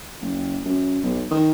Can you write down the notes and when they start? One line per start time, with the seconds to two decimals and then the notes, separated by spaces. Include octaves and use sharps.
0.21 F#1
0.65 F#2
1.03 B1
1.31 D#3